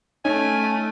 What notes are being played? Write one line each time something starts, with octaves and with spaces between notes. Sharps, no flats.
A3 C#4 D#4 G#5